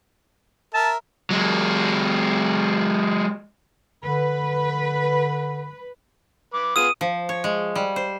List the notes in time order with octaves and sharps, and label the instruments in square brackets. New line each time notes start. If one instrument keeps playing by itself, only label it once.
[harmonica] A#4 E5 [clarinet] A5
[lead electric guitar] F#3 G#3
[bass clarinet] D3 [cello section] B4
[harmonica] B4 D6
[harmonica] B3 F4 G#4 [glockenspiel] D#6 D#7
[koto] F3
C#5
G#3
G3
C5